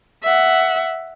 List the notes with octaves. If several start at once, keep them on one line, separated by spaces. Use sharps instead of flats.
E5 F#5